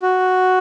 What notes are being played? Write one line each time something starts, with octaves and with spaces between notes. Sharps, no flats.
F#4